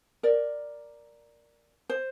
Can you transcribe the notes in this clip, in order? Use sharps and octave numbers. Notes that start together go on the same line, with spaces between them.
A#4 D5
C5